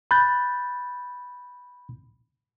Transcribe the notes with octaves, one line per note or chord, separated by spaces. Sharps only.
B5 F#6 G6 A6